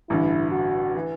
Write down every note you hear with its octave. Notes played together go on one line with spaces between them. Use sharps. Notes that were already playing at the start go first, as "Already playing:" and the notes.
A1 G2 D3 E4
F#4
E3